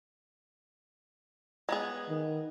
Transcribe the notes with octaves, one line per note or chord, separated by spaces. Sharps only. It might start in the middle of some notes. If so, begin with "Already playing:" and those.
G#3 B3 G#4
D#3